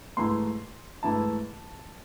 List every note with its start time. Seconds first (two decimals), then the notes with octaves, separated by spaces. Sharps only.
0.17 G#2 E3 A3 E4 C6
1.03 G#2 E3 A3 E4 A5